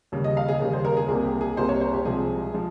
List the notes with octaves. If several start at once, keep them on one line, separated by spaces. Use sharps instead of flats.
D#2 C#3 G3
D#5
F5
G#4
D#2 C#3 G3 G#4
C5
A#4
G#4
C2 C3 G3 A#3 G#4
G4
G#4
C2 C3 G3 A#3 C5
C#5
C5
G4
C2 C3 F3 G#3 G#4
F3 G#3